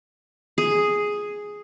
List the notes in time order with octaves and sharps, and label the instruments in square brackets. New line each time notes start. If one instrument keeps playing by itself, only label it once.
[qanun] G#4